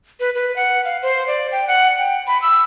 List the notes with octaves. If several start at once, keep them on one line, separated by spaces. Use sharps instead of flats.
B4
B4
F#5
F5
C5
D5
G5
F#5
G5
B5
E6